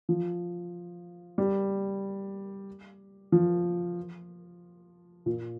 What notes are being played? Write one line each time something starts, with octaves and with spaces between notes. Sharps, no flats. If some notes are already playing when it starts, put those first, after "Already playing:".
F3
G3
F3
A#2